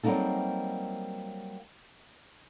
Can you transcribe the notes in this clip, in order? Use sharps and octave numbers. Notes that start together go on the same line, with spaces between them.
F#3 G3 A#3 C4 D#4 A4